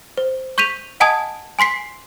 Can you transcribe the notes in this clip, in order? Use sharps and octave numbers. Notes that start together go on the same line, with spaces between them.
C5
C#6 G6 B6 D#7 F7
D#5 F#5 G#5 A5 D#6 G#6
G#5 C6 B6 C7